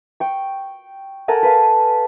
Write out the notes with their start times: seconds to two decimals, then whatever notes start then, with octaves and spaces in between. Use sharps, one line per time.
0.20 G5 C#6
1.28 A4 A#4 F#5 G#5
1.43 B4 F5